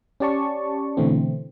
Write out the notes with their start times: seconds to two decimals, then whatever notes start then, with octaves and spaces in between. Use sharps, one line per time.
0.20 C#4 G4 D5 A5 C#6
0.97 B2 D3 E3 A3 C4